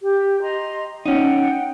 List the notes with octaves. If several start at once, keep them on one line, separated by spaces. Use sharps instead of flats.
G4
D#5 A#5 C6
C#4 D#4 F#5 G5